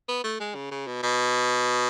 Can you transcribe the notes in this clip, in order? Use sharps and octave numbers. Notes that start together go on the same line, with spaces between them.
B3
A3
G#3
C#3
C#3
B2
B2